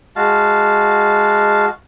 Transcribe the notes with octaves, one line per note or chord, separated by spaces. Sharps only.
G#3 F#4 F5 A5